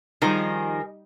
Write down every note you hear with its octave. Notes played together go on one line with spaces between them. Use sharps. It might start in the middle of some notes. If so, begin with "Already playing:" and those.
D#3 F3 G3 D#4 G#4 A#4 D#5